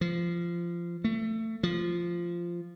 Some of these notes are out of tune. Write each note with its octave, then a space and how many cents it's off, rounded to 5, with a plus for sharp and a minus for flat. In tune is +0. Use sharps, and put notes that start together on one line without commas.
F3 -20
A3 +20
F3 -10